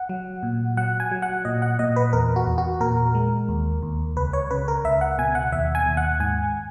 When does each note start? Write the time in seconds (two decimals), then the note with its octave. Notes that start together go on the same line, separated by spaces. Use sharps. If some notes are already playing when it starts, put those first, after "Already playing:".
Already playing: F#5
0.09 F#3
0.43 A#2
0.77 F#3 F#5
1.00 G#5
1.11 F#3
1.22 F#5
1.45 A#2 D#5
1.62 F#5
1.79 A#2 D#5
1.96 B4
2.13 E2 A#4
2.36 F#4
2.47 E2
2.58 F#4
2.81 A#2 A#4
3.15 G#3
3.48 D#2
3.83 D#2
4.16 C#2 B4
4.33 C#5
4.51 C#3 B4
4.68 A#4
4.85 C#2 E5
5.01 F#5
5.18 B2 G#5
5.35 F#5
5.52 D#2 E5
5.75 G#5
5.86 D#2
5.97 F#5
6.20 G#2 G#5